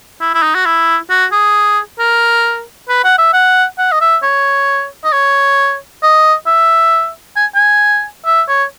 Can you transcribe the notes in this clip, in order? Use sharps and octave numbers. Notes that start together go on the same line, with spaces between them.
E4
E4
D#4
F#4
E4
F#4
G#4
A#4
B4
F#5
E5
F#5
F#5
D#5
E5
C#5
D#5
C#5
D#5
E5
G#5
G#5
E5
C#5